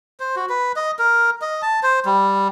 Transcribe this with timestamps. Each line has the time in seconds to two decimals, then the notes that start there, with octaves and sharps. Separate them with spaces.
0.20 C5
0.36 F#4
0.49 B4
0.76 D#5
0.99 A#4
1.42 D#5
1.62 A5
1.83 C5
2.06 G3